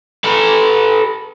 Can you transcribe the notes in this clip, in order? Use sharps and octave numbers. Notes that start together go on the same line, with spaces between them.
A4 B4